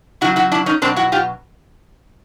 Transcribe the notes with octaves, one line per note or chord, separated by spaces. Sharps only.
C#3 F#3 E4 F#4
E4 F#4
D4 E4
C#4 D#4
B2 F#3 C4 D4
E4 F#4
F4 G4